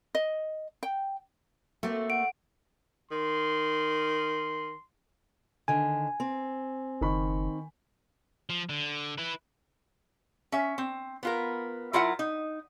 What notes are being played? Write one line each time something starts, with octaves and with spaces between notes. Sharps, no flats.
D#5
G5
A3 A#3 C4 F#4
F#5 D7
D#3 C6
D3 D#3 G#5
C4
F#1 D#3 B5 C#6
F3
D3
E4 B4
C#4 E5
C4
B3 F4 A#4
F#3 E4 F4 A#4 E5 F#5
D#4